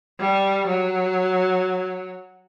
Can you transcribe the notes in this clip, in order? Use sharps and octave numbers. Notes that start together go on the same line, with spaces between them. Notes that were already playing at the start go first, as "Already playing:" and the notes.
G3
F#3